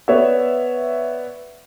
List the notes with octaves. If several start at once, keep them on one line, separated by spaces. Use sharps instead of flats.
B3 C#5 D5 E5